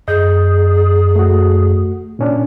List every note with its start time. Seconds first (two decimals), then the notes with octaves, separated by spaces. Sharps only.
0.08 F#2 G#4 D#5 G6
1.16 A3 F#4
2.19 A#2 C#4 D4